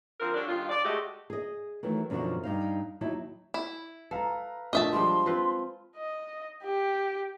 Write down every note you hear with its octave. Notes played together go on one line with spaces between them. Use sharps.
D3 F3 C4 A#4
D3 G3 C#4 D4
G2 D#3 F4
D5
G#3 A3 F#4 G4 D#5
G#4 D#5
D#3 E3 F#3 A3
F#2 B2 D3 D#3 F3 F#4
G2 D#4 F5
D#2 F#3 D#4 E4 A5
E4
A4 B4 F5 A#5
A#2 A3 D4 D#5 E5 A5
F3 G3 G#3 C6
C4 F4 B4
D#5
G4